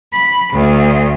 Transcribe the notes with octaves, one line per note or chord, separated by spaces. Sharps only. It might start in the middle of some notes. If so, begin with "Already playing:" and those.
B5
D2